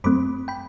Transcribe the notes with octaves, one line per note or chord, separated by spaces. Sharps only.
F#2 F#3 A3 C4 B5 D6
G5 B5